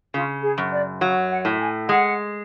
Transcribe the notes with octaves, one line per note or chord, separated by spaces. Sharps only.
C#3 F4
G#4
F#2
D5
F#3 F5
F#5
A2
G#5
G#3 F#5